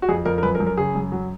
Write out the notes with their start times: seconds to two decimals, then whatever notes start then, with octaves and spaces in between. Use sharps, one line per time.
0.02 F#4
0.09 F2 G#4
0.25 F2 A#4
0.38 A#4
0.43 F#2 B4
0.55 A#4
0.60 F#2
0.66 A#4
0.77 C#3 G#4
0.95 F#2
1.12 F#3